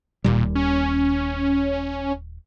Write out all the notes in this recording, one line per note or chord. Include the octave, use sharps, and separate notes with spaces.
D#1 D#2 A#2 G3
C#4